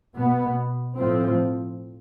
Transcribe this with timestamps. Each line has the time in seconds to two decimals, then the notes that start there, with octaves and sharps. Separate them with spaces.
0.16 B2 B3
0.98 A2 F3 C4